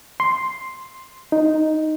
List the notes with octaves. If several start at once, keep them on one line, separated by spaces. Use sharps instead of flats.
C6
D#4